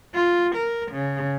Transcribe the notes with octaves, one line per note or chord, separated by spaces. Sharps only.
F4
A#4
C#3